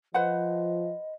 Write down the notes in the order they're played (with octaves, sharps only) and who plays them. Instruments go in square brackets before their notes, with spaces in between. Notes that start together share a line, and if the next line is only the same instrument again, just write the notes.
[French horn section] F3 [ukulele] B4 C5 F#5 [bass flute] D#5